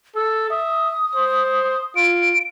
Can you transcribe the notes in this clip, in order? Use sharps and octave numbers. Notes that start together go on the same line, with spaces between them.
A4 E6
E5 D#6
C5
F4 D7